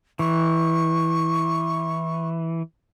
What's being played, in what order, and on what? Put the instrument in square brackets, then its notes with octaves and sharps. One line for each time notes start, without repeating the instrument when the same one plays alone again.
[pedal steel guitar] E3 [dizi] C#6